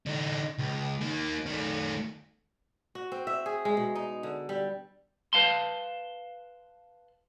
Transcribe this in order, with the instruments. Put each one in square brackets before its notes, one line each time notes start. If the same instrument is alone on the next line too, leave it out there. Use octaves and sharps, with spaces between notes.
[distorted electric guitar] D3 D#4
C#2
D#3 A#3
D#3 A3
[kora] F#4
C4
E5
G#4
G#3
B2
D#4
D3
G3
[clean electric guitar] B4 F5 A5 C6